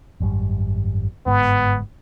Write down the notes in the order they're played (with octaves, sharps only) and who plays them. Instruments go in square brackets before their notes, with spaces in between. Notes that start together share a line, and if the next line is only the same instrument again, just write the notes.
[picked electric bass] G#1 F#2 G3
[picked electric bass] G1 G#2 [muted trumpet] B3